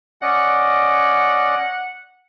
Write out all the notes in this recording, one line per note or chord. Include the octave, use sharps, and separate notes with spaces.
C#4 D5 D#5 F#5